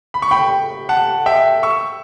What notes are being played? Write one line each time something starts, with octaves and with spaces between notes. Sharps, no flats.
B5
C#6
G5 B5
F#5 A5
E5 G5
C#6 E6